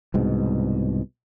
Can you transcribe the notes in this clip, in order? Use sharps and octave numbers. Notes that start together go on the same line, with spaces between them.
C2 G#2 B2